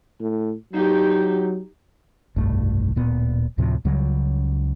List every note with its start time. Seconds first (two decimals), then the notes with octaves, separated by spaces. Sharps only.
0.20 A2
0.73 F#3 D#4 G4
2.36 F1 B1 G2 A3
2.96 D1 A#2 B3
3.58 D2 A2 C3 F3
3.85 C#2 C#3 F#3 G3